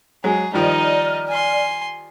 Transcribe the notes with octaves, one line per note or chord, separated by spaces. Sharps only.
F#3 G#3 G#4
D#3 F3 G3 D#4 D5 D#5 F6
G#5 C6